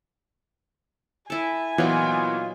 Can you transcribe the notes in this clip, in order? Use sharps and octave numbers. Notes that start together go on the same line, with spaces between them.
E4 A4 G#5
A#2 E3 F#3 B3 D#4 F4